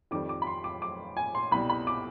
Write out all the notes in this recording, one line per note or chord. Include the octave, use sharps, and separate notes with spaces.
F2 D#3 G3 D6
D6
B5
C6
D6
D6
G#5
C6
C2 B2 G3 B5
B5
D6